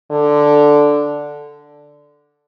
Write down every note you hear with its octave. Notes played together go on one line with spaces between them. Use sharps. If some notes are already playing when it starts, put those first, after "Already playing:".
D3